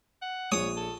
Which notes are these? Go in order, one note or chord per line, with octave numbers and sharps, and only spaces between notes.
F#5
A#1 C#5 D#6
A4